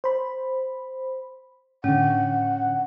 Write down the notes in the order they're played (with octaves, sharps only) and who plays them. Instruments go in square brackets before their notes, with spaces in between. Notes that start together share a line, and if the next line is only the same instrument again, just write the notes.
[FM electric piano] C5 B5
[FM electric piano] A2 D3 [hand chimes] C#4 [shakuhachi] F#5